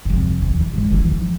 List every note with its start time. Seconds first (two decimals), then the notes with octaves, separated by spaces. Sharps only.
0.05 F2 C3
0.42 E2 E3
0.56 B2
0.73 G#2
0.90 E2 E3
1.10 F3